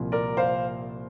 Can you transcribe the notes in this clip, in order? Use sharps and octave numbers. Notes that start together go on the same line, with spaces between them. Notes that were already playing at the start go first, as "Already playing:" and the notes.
Already playing: C2 A#2 F3
A#4 D5
C5 F5